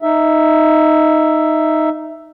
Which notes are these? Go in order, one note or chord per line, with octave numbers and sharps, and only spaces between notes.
D#4 E5